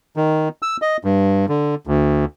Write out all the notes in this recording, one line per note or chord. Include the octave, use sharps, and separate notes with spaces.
D#3
E6
D#5
G2
D3
D2